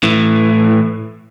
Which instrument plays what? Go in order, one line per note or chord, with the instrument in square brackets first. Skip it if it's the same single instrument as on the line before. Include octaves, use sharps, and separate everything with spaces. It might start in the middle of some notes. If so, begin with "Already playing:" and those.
[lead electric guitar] A2 E3